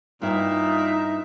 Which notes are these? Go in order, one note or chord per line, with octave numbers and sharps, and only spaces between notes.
G2 A#2 D#4 E4 E5